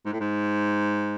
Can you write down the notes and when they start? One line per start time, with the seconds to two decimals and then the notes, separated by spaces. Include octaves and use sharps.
0.06 G#2
0.13 A2
0.20 G#2